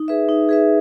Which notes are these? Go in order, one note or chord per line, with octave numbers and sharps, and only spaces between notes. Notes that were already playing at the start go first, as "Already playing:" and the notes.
Already playing: D#4
G#4 B4 E5
D#4
G#4 B4 E5